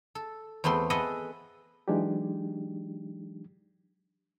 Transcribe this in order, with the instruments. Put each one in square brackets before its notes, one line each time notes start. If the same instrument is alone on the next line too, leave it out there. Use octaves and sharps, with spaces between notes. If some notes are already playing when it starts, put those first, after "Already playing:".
[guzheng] A4
E2 A3 B3 C4 C6
G#4 A4 B4 D#5 E5 F#5
[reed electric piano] E3 F#3 G#3 D4 D#4 G4